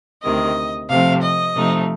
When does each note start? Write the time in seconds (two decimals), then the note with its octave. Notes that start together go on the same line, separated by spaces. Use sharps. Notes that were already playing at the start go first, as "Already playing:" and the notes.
0.22 D2 C3 D#3 D#5
0.89 C3 F3 A3 C4 F5
1.22 D#5
1.55 C3 F3 A3 D#4